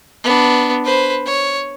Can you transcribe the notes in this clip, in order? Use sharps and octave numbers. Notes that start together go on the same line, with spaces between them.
B3 D4
B4 C5
C#5